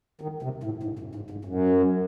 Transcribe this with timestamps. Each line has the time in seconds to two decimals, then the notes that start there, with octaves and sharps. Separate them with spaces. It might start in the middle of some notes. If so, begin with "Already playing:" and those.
0.21 D#3
0.43 C3
0.64 A2
0.83 G#2
0.99 F#2
1.15 G#2
1.30 G#2
1.45 F#2